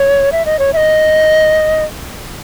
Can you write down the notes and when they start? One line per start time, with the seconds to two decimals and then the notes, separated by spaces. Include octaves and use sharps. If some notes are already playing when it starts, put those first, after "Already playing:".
Already playing: C#5
0.32 E5
0.46 D#5
0.59 C#5
0.73 E5
0.77 D#5